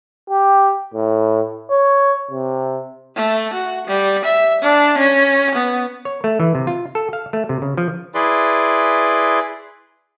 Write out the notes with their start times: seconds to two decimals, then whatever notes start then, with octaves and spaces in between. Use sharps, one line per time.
0.30 G4
0.94 A2
1.70 C#5
2.31 C3
3.16 A3
3.53 F#4
3.87 G3
4.25 E5
4.61 D4
4.98 C#4
5.55 B3
6.05 C#5
6.24 A3
6.40 E3
6.55 C3
6.67 F4
6.95 A4
7.13 F5
7.33 A3
7.49 C3
7.62 C#3
7.77 F3
8.15 E4 G#4 B4 D5 C6